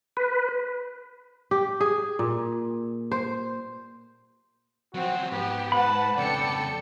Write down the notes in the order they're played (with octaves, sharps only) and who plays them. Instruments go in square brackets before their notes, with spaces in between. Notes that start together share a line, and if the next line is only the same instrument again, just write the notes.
[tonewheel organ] B4
[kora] G4
G#4
A#2
C5
[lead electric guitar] F3 F#3 [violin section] C4 [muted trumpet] F#4
[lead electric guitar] G#2 [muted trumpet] B3 [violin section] G4
[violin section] B4 A5 [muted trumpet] F#5 [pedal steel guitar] B5
[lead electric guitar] F2 C#3 [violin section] A4 G5 C#7 [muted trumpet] D5